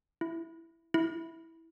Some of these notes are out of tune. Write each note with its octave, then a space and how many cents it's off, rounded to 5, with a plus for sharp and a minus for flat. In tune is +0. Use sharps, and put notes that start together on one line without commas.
E4 +5
E4 -10